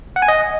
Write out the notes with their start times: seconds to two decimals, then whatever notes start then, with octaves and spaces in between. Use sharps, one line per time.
0.16 F#5
0.22 G#5
0.28 D#5